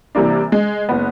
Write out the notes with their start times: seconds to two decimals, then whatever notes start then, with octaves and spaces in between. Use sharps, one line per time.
0.15 C3 E3 G3 A#3 D4
0.52 G#3
0.89 F#1 B3